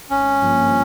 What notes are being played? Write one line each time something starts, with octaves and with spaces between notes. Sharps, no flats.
G#1 C#4
G2 F3 A#3